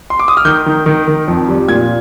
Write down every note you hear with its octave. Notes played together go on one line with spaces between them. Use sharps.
C6
D6
D#6
F6
D#3 G6
D#3
D#3
D#3
F2
G3
A#2 G#6